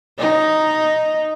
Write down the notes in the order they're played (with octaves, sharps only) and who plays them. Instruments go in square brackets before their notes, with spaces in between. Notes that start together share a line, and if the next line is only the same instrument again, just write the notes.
[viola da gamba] D#4